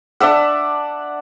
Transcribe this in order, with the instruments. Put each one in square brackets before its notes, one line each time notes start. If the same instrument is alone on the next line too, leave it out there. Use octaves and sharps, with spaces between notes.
[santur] D4 D5 E5 F#5